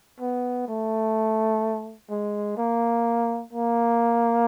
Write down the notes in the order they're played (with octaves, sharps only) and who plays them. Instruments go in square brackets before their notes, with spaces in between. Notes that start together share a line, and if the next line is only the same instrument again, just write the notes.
[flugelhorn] B3
A3
G#3
A#3
A#3